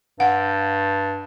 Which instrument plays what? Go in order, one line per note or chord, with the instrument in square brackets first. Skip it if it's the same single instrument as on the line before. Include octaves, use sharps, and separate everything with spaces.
[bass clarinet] G2 [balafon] F#5